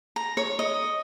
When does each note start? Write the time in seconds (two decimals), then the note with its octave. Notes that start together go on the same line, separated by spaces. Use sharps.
0.16 A#5
0.37 C#5
0.59 D#5